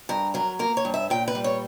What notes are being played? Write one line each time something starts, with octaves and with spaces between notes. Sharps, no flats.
G2 A#4
F#3 A#4
A#3 A#4
C#5
G2
E5
A#2 G5
B4
G3
C#5